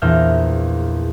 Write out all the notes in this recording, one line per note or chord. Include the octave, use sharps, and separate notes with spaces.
A#1 E2 A#4 E5 F6 G6